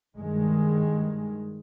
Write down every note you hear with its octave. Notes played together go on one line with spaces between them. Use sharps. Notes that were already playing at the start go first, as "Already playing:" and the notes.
G2 D#3 G#3